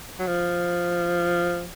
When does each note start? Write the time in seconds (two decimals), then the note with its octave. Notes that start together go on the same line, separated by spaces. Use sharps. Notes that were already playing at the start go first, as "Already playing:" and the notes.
0.19 F#3
0.28 F3